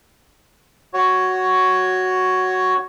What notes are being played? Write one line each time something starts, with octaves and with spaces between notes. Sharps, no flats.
F#4 C#5